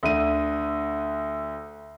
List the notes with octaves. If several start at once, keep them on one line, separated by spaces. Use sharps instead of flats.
D2 D3 D#7